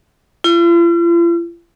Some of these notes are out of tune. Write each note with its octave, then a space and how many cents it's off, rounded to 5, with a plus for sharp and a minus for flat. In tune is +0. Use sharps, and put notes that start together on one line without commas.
F4 -45